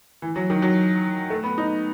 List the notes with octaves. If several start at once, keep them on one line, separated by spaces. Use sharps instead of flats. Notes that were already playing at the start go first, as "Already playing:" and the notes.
E3
F#3
D#3
F#3
A3
B3
D#4